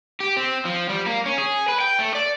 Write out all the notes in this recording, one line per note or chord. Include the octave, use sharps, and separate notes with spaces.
G4
C4
F3
G3
A#3
C#4
G#4
B4
G5
A3
D5